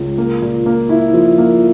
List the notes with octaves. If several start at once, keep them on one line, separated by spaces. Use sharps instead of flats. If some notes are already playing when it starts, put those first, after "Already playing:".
Already playing: C#2
A#3
A#2
A#3
E4
F3
A#3